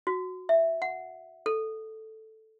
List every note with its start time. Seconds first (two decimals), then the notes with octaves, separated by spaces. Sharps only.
0.07 F#4
0.49 E5
0.82 F#5
1.46 A4